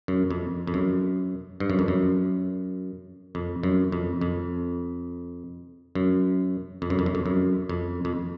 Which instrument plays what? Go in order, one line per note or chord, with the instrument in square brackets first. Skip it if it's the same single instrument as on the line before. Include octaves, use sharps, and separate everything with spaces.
[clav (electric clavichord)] F#2
F2
F2
F#2
G2
F#2
F2
F#2
F2
F#2
F2
F2
F#2
F2
F#2
F2
F#2
F2
F#2
F2
F2